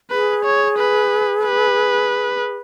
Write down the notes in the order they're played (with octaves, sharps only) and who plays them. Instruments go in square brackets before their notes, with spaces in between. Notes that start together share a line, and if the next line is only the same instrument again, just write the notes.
[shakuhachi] G#4 [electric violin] B4
[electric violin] C#5
B4
B4